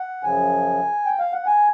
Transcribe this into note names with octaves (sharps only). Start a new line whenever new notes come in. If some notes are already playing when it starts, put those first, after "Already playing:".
Already playing: F#5
F#2 C#3 F3 G#5
G5
F5
F#5
G#5